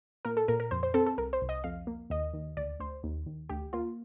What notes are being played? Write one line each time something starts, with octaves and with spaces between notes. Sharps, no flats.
A#2 A#4
A4
A#2 A#4
A#4
F2 C5
C5
C4 A4
A4
C2 A#4
C5
C2
D#5
F2 F5
A#3
D#2 D#5
D#2
D2 D5
D2 C5
D#2
D#2
D2 G4
A#3 F4